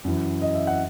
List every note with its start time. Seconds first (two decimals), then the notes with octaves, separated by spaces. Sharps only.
0.04 F#2 E3
0.42 D#5
0.55 E5
0.67 F#5